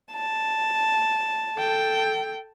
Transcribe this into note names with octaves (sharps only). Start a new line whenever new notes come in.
A5
A4 G5